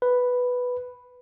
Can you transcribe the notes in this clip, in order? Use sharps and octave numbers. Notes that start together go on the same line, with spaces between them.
B4